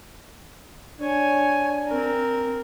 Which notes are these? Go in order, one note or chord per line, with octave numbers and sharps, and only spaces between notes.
D4 C#5 G#5
C4 A#4